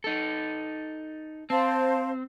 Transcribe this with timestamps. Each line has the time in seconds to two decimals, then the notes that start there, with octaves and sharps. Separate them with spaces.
0.04 D#4 A4
1.50 C4 C5 F5 A5